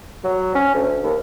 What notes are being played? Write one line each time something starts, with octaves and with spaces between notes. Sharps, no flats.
F#3
C#4
D2
D#2